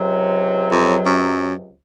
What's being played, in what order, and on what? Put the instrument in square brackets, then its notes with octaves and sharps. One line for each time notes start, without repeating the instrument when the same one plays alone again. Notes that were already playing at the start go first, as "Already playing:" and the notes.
Already playing: [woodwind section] C#2 C3 F#3
[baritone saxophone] F2
F#2